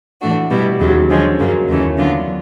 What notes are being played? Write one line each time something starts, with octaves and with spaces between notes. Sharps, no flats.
A2 E3 A3 D4 F#4
B2 G3 B3 E4
D#2 C#3 F#3
D3 F3 G#3 C#4
F#2 C#3 F#3 A#3
D#2 C#3 E3 A3 C#4
D3 F#3 B3 D4 F4